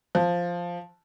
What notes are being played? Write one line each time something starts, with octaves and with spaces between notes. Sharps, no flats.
F3